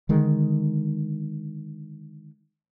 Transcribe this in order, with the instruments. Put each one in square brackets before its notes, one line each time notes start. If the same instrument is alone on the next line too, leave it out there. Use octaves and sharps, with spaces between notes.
[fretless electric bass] D3 D#3 G#3